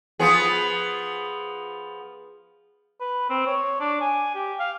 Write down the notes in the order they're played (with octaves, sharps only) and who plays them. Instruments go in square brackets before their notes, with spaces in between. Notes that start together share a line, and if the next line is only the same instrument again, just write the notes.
[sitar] F3 B3 G#4
[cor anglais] B4
C4
C#5
D4
G#5
G4
F5